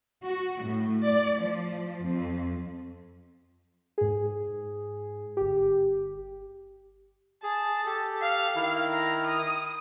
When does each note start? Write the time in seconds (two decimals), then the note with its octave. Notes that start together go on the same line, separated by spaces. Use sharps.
0.24 F#4
0.64 A2
1.05 D5
1.40 F3
2.07 F2
3.98 G#2 G#4
5.37 G1 G4
7.44 G#4 A5
7.86 G4 A4
8.22 F5
8.55 D#3 E4 F6
8.91 A#5
9.26 D#6